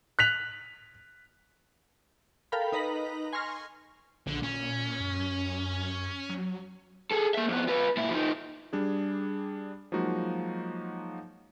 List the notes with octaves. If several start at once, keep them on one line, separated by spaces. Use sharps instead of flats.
F#6 B6 F7
A4 A#4 F5 G5 B5
D#4 B4 D#5 A#5 B6 F#7
G#5 C6 C#6 F6 A#6
A#1 D3
A#2 C#4
F#2
F#3
G#4 A4
A#3 E5
F2 B3
F4 B4
A#2 E4
F3 D#4
G3 D4 G#4
F3 F#3 G#3 A#3 D#4 F#4